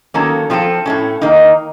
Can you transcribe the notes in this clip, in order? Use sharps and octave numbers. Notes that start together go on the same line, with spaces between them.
D#3 F#3 A#3 C#4 A4
F3 C4 F4 A4
A2 A3 C#4
D#3 A#3 D#4 A#4